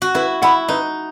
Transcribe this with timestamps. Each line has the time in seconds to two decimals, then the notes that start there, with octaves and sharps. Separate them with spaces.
0.02 F#4
0.15 E4 B4
0.42 E4 F#5 B5
0.68 D#4 B4